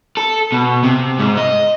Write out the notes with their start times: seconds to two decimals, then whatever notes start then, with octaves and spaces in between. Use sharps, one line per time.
0.17 A4
0.52 B2
0.83 C3
1.19 G#2
1.37 D#5